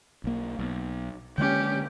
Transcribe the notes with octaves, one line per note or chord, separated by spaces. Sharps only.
B1 A#3
B1
D3 G#3 A#3 C#4 G4